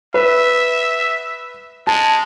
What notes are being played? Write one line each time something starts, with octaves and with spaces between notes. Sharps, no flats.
B4 E5
G#3 A5